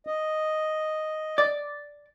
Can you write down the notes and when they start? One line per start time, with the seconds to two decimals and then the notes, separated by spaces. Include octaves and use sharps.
0.07 D#5
1.38 D5